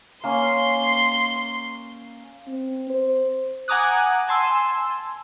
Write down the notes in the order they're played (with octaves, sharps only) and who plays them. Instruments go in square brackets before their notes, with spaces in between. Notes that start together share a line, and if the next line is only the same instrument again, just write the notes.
[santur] A#3 C#4 [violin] C6
[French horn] C4
C5
[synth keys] F#5 G#5 A#5 D6 D#6 F#6
G#5 A5 C6 E6